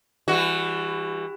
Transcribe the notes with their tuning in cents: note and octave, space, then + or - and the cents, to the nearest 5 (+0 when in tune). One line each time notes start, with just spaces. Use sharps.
E3 +15 G3 +40 F#4 +0